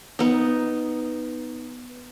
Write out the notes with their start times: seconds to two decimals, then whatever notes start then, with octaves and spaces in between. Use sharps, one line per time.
0.19 B3 D#4